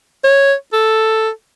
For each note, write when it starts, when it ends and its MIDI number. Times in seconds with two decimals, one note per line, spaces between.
0.24 0.54 73
0.73 1.30 69